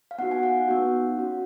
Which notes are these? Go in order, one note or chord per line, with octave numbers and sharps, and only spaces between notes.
F5
B3 D#4 F#4 F#5
G#5
F#5
B3 D#4 F#4
C#4 F#4